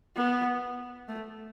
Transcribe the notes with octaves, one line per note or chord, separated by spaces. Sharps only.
B3
A3